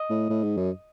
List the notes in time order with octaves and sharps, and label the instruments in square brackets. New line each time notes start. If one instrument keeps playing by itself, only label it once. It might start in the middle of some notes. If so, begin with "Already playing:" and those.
Already playing: [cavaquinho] D#5
[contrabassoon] A2
A2
G#2
F#2